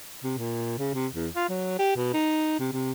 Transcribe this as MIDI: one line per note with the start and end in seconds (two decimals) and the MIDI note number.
0.24 0.33 48
0.38 0.77 46
0.79 0.90 49
0.94 1.07 48
1.15 1.28 40
1.36 1.46 65
1.49 1.77 54
1.79 1.95 67
1.96 2.09 47
2.14 2.59 63
2.59 2.70 48
2.73 2.92 48